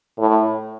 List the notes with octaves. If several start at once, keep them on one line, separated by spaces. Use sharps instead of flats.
A2